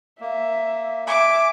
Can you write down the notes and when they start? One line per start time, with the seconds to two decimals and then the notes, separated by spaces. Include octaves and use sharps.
0.21 A#3 E5
1.07 E5 G#5 D6